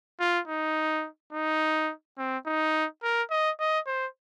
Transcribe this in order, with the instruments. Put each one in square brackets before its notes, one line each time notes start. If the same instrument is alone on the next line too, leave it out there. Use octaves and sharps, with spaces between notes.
[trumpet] F4
D#4
D#4
C4
D#4
A#4
D#5
D#5
C5